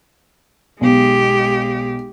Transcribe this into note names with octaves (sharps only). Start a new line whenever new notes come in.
B1 G#3 G4